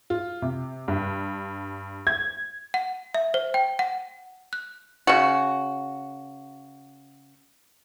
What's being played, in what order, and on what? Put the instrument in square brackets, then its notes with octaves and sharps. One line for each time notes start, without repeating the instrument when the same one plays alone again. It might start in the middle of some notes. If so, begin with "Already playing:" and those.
[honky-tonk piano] F4
C3
G2
G#6
[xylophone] F#5
E5
C5
G5
F#5
F#6
[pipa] C#3 F#4